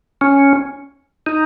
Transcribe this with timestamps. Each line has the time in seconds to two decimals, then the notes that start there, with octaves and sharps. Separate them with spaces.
0.21 C#4
1.26 D#4